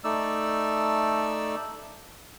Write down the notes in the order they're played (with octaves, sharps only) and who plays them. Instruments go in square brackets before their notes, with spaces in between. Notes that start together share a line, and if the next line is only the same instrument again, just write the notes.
[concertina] A3 D#4 D5 E6